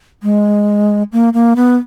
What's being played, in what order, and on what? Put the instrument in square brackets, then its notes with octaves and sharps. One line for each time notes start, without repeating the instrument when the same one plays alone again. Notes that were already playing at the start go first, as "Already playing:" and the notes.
[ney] G#3
A#3
A#3
B3